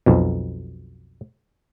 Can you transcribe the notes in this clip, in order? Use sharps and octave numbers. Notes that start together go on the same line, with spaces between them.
B1 F2 B2